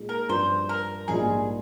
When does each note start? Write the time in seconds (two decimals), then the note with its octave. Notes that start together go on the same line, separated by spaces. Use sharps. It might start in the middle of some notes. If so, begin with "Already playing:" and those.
Already playing: A#2 G#3 D#4 G#4
0.09 A#4
0.29 G2 F3 C4 C5
0.69 A#4
1.08 A#1 G#2 G3 A#3 F4 G#4